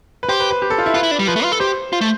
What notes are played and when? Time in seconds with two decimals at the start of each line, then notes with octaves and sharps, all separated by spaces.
0.23 B4
0.29 G4 C5
0.40 B4
0.51 B4
0.62 G4
0.70 A4
0.78 F4
0.86 E4
0.95 F4 B4
1.03 E4
1.11 D4
1.19 G3
1.28 F3 B4
1.36 A3
1.43 F4
1.52 A4
1.60 G4 C5
1.93 F4
2.01 A3